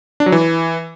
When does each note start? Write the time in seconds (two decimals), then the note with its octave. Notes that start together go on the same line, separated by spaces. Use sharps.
0.20 D4
0.26 F#3
0.32 E3